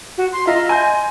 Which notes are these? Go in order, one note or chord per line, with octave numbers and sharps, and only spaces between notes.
F#4
C6
F4 D#5 E5 A#5
G#5 C6 G6